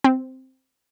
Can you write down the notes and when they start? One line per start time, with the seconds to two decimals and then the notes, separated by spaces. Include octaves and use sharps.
0.04 C4